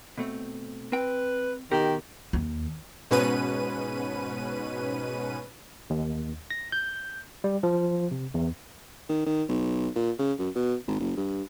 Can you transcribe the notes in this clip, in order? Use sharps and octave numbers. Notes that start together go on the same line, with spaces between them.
B2 A3 C4
C4 B4 G5
B2 D#3 G4 A#4
D#2
G#2 B2 C#4 B4 D#7
D#2
A#6
G6
G3
F3
C3
E2
D#3
D#3
B1
A#2
C#3
F#2
B2
G#1
F#1
G2